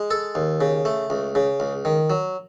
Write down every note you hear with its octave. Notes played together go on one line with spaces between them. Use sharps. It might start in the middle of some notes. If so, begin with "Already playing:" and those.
Already playing: G#3
A4
D#2
C#3
A3
C#2
C#3
C#2
D#3
F#3